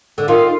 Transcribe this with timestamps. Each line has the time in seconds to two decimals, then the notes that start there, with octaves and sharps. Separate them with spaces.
0.18 D3
0.28 D#3 F4